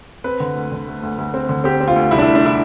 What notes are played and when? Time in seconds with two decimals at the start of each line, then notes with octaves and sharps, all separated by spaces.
0.24 C4 B4
0.40 D3
0.56 D2
0.72 D3
0.87 A3
1.03 D2
1.18 D2
1.34 C4
1.49 D3
1.64 C4 G4
1.80 C4
1.88 F4
1.96 D2
2.11 C2 E4
2.18 D4
2.22 E4
2.26 A3
2.35 D4
2.46 E4